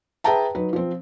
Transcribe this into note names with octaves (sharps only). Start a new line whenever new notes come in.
G#4 B4 E5 G5 A5 A#5
F#3 D#4 B4
F3 C4